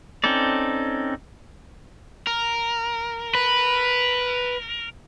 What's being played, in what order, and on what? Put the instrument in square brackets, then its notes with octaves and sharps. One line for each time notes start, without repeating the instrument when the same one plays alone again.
[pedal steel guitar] C4 C#4 D#4 A4 D5
[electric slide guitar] A#4
[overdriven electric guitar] B4